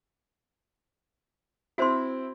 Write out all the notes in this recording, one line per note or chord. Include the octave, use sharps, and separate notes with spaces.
C4 E4 F#4 C5 C6